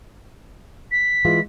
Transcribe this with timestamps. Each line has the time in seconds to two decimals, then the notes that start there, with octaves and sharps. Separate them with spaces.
0.91 B6
1.25 E3 G#3 F4